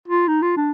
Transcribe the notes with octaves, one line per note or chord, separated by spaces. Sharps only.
F4
D#4
F4
D4